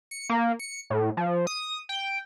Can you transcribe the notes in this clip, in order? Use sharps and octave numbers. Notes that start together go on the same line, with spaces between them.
C#7
A#3
C#7
A2
F3
D#6
G5